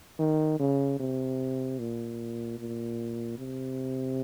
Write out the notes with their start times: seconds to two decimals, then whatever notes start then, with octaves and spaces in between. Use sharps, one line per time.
0.19 D#3
0.59 C#3
0.99 C3
1.79 A#2
2.58 A#2
3.38 C3